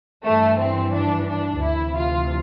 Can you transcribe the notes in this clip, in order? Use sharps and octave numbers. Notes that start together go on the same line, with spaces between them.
G2 E3 A3
C4
D4
D4
D2 C3 E3 E4
F4